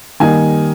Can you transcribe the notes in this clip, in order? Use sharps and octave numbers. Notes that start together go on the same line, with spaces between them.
D#3 G3 A#3 D#4 G#5